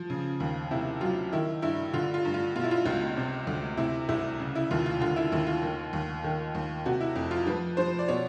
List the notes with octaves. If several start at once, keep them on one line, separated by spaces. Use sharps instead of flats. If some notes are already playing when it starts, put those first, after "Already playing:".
Already playing: F3
C#3
D#2
C3 E4
F#3 F4
D#3 E4
G2 E4
D3 F4
F4
G2
F4
B2 F4
E4
F4
C#2 F4
C3
D2
C3 E4
C2 E4
C#3
E4
D#2 F4
F4
D3 F4
E4
D#2 E4
F4
D#3
D#2
D#3
D#2
C3 F#4
E4
F2
F4
F3 B4
F3 C5
D5
B2 C#5